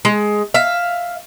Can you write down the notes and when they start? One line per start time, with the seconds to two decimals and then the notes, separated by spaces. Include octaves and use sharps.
0.05 G#3
0.54 E5 F5